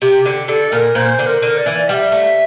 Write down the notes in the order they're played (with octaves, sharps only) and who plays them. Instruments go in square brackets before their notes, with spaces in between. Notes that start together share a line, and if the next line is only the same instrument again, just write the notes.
[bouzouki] C3 [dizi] G4
[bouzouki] D3 [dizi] G4
[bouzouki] D3 [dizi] A4
[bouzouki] A#2 [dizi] A#4
[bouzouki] A#2 [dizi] C5
[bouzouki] D3
[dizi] A#4
[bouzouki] D3
[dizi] D5
[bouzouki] E3
[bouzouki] G3 [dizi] E5 G5
[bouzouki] A3